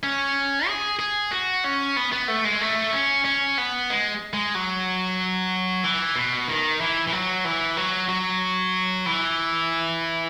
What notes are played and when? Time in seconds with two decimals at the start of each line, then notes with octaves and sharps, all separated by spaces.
0.03 C#4
0.67 G#4
0.99 G#4
1.32 F#4
1.64 C#4
1.96 B3
2.12 B3
2.28 A3
2.45 G#3
2.61 A3
2.93 C#4
3.25 C#4
3.58 B3
3.90 G#3
4.33 G#3
4.55 F#3
5.84 E3
6.16 B2
6.48 D#3
6.81 E3
7.08 E3
7.12 F#3
7.45 E3
7.77 F#3
8.09 F#3
9.06 E3